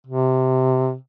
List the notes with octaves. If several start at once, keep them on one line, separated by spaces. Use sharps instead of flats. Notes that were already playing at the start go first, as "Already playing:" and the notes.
C3